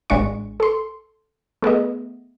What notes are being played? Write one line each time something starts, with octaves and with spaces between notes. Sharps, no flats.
A1 G#3 D4 C#6
A4 C6
A3 B3 G#4 D#5